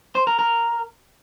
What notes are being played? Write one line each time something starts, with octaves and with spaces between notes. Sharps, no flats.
C5
A#4
A#4